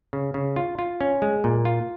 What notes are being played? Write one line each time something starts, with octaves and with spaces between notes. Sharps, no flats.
C#3
C#3
F4
F4
C#4
G#3
A#2
F4